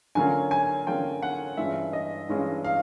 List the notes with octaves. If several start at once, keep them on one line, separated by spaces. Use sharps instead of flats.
D3 F#3 A#3 C#4 F4 G#5
G#5
D3 F#3 A#3 C#4 F4 G5
F#5
G2 E3 G#3 C#4 F4 E5
D#5
G2 E3 G#3 C#4 F4
F5